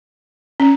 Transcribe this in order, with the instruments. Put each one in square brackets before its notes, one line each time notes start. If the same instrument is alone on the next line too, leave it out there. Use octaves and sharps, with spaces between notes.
[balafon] C#4